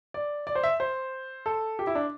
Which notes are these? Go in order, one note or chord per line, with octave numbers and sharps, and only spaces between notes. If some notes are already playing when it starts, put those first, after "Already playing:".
D5
D5
C5
E5
C5
A4
G4
E4
D4